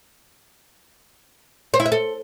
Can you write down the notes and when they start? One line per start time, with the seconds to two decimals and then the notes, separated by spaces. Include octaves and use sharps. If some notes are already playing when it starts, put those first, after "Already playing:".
1.74 C5
1.80 E4
1.86 E5
1.92 A4